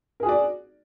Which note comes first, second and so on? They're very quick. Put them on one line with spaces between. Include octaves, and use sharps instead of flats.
A#4 G#4 F#4 D5